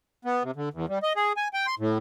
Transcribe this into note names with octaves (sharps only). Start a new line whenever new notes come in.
B3
C3
D3
E2
G3
D#5
G#4
G#5
G5
C6
A2